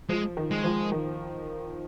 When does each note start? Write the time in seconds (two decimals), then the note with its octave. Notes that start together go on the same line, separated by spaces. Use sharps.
0.09 F3 G#3
0.37 D#3
0.51 G#3
0.64 F3
0.92 D#3